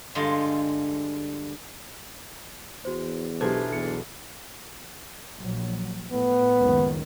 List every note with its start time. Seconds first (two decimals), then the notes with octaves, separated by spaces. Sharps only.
0.15 G2 D3 G#3 F4 D#5
2.85 E2 F#4 C5
3.41 B1 E3 D4 F4 G4 A4 C5 G#6
3.73 E2 C#7
5.40 A#1 F#3
6.12 A2 B3
6.56 F#1 C#2 D#3